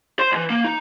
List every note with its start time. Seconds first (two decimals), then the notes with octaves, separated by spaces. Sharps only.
0.19 C5 C6
0.32 C#2 E3
0.50 A#3
0.65 D#4